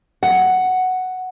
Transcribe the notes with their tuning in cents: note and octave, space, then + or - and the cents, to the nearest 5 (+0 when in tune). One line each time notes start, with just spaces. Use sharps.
F#5 +5